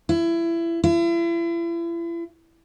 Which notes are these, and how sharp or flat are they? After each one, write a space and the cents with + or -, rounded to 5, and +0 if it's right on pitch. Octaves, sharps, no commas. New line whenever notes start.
E4 +25
E4 +40